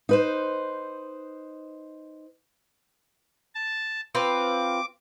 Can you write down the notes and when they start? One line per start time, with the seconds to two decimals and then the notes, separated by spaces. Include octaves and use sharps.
0.09 D#4 B4 C5
3.55 A5
4.15 C4 F4 B4 D6